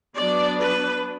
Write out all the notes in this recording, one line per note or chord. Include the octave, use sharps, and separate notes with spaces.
F#3 B3 D4 D5
B4